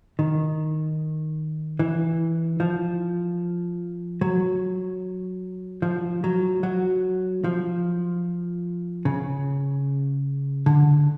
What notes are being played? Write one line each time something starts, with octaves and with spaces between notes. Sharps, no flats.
D#3
E3
F3
F#3
F3
F#3
F#3
F3
C#3
D3